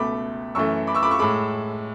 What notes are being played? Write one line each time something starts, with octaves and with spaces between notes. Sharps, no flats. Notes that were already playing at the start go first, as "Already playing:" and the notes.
Already playing: C#2 B2 A3 B5 D6
F#2 E3 A3 C#6 E6
B5 D6
C#6 E6
B5 D6
C#6 E6
A2 G#3 B5 D6